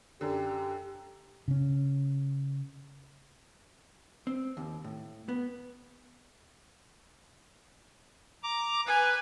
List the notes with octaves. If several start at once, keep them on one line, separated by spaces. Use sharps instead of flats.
F#2 D3 G4
C#3 C#4
C4
D#2
A2
B3
A#5 D6
B4 G#5